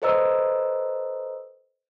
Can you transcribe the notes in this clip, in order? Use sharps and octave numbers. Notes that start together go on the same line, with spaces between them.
A4 B4 C5 D#5 A#5 E6